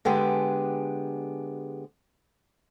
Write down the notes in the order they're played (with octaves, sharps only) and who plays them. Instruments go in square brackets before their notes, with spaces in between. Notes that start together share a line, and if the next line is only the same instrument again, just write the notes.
[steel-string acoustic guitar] D3 G#3 B3 G4 G#4